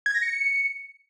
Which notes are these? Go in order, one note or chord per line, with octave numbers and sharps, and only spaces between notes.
G#6
A#6
C#7